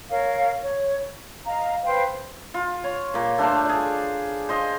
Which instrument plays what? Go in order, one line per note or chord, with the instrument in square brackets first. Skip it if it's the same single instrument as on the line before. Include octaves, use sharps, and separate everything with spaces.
[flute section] A#4 C#5 F5
C#5
D#5 F5 A#5
B4 C5 F5 G5
[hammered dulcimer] F4
C#5
A#2 D6
A3 D4 C5 F5
G#4 D5
C5 D#5 F5